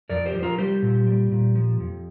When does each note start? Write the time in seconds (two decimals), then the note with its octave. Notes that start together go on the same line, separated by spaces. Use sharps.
0.09 F2 A#4 D5
0.26 G4 C5
0.34 F3
0.43 F4 A#4
0.58 G3 G4 C5
0.82 A#2
1.07 G3
1.32 A#2
1.55 F3
1.80 F2